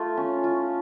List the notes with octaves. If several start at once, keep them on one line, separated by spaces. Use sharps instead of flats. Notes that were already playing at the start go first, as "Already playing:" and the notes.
Already playing: A3 F4
C#4
F4